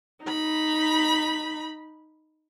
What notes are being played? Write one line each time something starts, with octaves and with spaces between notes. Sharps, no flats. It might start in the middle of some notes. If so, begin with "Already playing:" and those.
D#4 B5